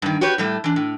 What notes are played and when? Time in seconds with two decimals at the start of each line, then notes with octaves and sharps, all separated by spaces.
0.02 G2 D#3
0.21 F#4 G4 B4 C#5
0.38 A2 G3 A3
0.64 E3 D4
0.76 A2